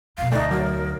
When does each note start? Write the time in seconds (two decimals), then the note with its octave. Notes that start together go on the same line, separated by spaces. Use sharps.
0.18 F2 B2 F5
0.32 D2 A3 D#4 D5
0.51 F#3 A#4